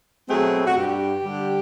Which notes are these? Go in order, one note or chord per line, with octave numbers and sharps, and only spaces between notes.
B2 F#3 A3 C4 G#4
F#4
G2 G4
D3 G3